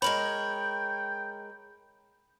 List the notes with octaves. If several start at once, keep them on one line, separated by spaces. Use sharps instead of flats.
G#3 A#4 C#5 G5 B5 F#7